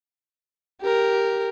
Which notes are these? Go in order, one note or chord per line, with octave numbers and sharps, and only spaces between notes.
G4 A#4